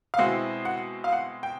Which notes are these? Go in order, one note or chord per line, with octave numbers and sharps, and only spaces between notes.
F5
B2 G#3 C4 E4 F#5
F#5
F5
F#5
G5